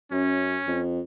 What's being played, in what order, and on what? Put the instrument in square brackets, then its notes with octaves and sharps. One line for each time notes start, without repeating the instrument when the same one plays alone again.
[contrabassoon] F#2 [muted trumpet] C#4
[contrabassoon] F2